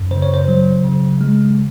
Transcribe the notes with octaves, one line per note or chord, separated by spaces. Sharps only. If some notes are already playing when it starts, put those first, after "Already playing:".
Already playing: F#2
C#3 C5
C#5
C5
F#3
C#3
G#3